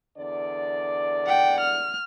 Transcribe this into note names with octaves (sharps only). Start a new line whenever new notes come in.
E2 D3 D5
F#5 G5
F6